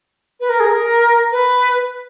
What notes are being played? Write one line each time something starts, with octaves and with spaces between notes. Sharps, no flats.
B4
A#4
G#4
A#4
B4